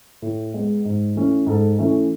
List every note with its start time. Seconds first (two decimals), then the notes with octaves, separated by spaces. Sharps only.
0.22 A2
0.54 G#3 B3
0.85 G#2
1.16 E3 A3 C#4
1.46 G#2 A4
1.78 E3 A3 C#4